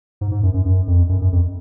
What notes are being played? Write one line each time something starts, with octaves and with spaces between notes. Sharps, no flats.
G#2
G#2
F#2
F#2
F#2
F2
F#2
F#2
F2